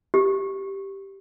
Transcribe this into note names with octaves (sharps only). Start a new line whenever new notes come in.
G4